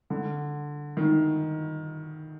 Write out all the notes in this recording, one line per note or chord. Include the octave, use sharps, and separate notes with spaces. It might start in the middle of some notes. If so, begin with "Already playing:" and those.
D3
D#3